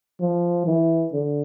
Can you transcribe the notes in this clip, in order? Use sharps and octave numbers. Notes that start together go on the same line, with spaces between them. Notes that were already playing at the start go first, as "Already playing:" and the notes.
F3
E3
D3